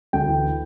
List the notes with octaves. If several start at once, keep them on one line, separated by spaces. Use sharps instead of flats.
D2 G5
E3